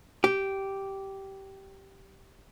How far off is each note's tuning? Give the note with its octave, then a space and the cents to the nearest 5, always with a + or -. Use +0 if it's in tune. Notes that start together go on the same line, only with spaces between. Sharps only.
G4 -10